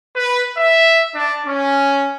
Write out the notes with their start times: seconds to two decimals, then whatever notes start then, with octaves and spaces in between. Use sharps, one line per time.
0.16 B4
0.58 E5
1.15 D4
1.46 C#4